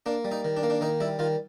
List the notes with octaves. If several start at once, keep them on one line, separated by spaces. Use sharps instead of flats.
A#3 D4
G3
D#4
D#3
D4
A#3
D4
D#3 D#4
G3 E4
D#3 F4